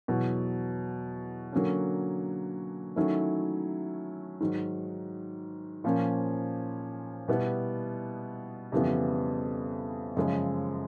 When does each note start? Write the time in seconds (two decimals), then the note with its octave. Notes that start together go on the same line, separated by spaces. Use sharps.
0.08 E2 B2 F#3
1.53 D3 F#3 A#3 C#4
2.96 D#3 F#3 A3 C#4 E4
4.40 G#2 D#3 F#3
5.84 A#2 F3 A#3 C#4
7.28 B2 G3 B3 E4
8.72 F2 C#3 E3 G3 B3
10.17 F#2 C#3 F3 G#3